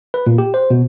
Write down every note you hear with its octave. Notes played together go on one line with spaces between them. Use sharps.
B4
A#2
G4
C5
B2